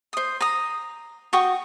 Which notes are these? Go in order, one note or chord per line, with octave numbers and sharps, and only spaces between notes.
C5 D#6
A#5 D#6
F#4 G5 C#6 D#6